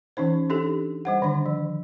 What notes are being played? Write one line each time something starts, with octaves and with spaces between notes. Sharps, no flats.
E3 C#4 D#4 C5
D4 D#4 G4 A4
G3 C5 F#5
D3 D#3 D4
F3